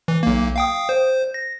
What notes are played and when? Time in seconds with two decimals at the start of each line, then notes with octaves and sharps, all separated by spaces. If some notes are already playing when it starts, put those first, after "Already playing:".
0.08 E3
0.23 B1 A#3
0.56 F5 G5 D#6
0.89 C5
1.34 A#6